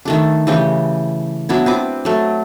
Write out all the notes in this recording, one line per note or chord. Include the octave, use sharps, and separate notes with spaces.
D#3 A3 D4
C#3 E3 A3 G4
F#3 B3 D4 E4
C4 B4 D6
F#3 A3